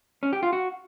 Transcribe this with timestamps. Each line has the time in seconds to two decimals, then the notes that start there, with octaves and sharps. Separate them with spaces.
0.23 C#4
0.33 G4
0.43 F4
0.53 F#4